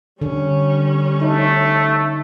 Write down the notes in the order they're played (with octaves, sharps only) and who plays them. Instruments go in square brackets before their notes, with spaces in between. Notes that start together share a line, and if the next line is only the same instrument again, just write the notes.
[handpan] D3 [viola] G3 C#4
[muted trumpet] A3 [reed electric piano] D#4